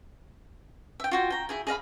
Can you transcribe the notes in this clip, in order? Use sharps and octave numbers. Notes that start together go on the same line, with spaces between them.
E5 G5
F4 F#4 G5
G5 A#5
E4 G#4 G#5
G#4 D#5 F5 B5